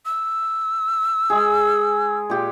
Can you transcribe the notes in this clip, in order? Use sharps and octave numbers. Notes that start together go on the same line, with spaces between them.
E6
G#3 G#4
A#2 G4